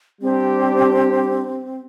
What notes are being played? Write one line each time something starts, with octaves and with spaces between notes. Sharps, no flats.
G3 C4 D4 G4